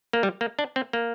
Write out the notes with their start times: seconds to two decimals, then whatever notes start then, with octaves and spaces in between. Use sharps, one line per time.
0.13 A#3
0.23 G3
0.41 A#3
0.59 D4
0.76 C4
0.93 A#3